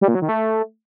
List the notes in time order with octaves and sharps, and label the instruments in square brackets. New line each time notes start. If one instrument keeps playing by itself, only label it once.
[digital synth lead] G3
A#2
F#3
D#3
A3